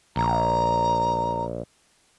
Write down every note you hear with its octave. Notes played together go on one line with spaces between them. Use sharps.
A#1 A#5